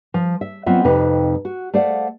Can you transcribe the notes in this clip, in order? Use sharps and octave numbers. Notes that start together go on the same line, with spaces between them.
F3
E5
F#3 B3 C4 F4 D#5 E5
F2 C3 F3 D#4 B4
F#4
A3 C5 D5 F5 F#5